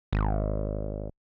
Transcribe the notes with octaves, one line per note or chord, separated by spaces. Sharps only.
G#1